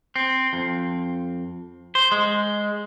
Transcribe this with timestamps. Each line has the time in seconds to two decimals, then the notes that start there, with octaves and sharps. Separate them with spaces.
0.16 C4
0.53 F2
1.95 C5
2.12 G#3